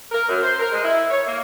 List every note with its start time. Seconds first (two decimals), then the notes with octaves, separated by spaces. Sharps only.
0.11 A#4
0.28 F#2
0.41 C5
0.59 A#4
0.72 G#3
0.84 E4
1.11 C#5
1.26 A#3